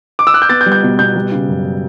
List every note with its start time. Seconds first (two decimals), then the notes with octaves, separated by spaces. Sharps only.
0.19 D6
0.27 E6
0.34 F#6
0.42 G6
0.49 B3 A6
0.61 G6
0.66 G3
0.72 G6
0.83 B2
0.99 B2 G6
1.16 G3
1.32 C#3
1.48 F#2